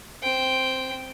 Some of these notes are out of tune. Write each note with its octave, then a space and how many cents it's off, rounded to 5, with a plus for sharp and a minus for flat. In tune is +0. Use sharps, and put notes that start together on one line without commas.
C4 +0 G5 +0